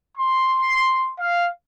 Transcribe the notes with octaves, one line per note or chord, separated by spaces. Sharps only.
C6
F5